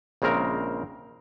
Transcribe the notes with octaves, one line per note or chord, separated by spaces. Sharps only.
A#1 C#3 G#3 C4 A#4